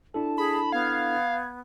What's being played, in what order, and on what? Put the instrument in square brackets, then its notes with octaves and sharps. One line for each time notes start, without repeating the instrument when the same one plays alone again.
[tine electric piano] D4 E4 A4 [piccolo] A5
[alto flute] G#4 [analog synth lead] B5
[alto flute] B3 [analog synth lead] F5 [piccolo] G#6